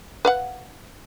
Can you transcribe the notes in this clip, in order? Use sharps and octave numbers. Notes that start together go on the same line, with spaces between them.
B4 F5 F#5